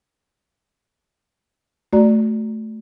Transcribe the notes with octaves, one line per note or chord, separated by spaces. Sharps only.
A3 F#4 D5 A#5